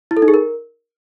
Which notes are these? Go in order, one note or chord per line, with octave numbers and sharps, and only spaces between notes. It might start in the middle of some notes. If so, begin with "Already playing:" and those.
E4
A4
D#4
G#4
A#4